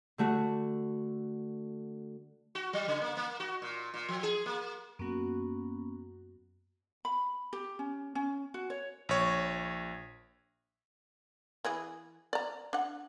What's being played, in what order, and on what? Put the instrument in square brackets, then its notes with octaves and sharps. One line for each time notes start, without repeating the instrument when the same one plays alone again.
[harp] D3 A3 F#4
[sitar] F#4
F#3
C#3
A#3
A#3
F#4
A#2
A#2
F3
G#4
A#3
[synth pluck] F#2 F#4 [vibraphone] A#3 B3 C#4
[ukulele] B5
G4
C#4
C#4
F#4
C#5
[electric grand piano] A#1 C#5
[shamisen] E3 E4 G#4
D5 A#5
D4 F#5